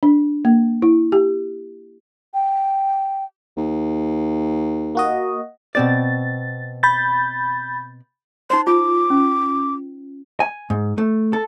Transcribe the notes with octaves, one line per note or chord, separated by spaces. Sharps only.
D4
A#3
E4
G4
G5
D#2
A#3 F#4 D#5
B2 C4 D5 A6
B5 G6 A6
D#4 C5 C6
F4 D6
C#4
G#5
G#2
A3
A4